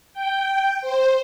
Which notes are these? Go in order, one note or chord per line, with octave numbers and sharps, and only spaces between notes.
G5
C5